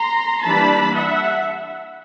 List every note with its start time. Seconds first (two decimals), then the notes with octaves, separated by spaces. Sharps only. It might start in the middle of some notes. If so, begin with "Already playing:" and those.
Already playing: A#5 C6
0.43 E3 G3 A#3 D4 A5 B5
0.94 E5 F#5